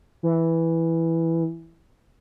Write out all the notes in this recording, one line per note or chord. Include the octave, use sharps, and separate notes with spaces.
E3